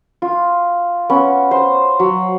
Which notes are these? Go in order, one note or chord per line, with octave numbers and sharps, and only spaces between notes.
F4
B3 C#4
C5
F#3